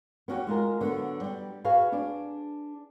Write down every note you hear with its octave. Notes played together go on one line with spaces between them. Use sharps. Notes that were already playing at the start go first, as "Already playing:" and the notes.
B3 C#4 F#4 G4
G#3 F4 G#4 A#4
D3 F#3 B3
G3 G4
F#4 G#4 B4 F5
D4 G#4 D5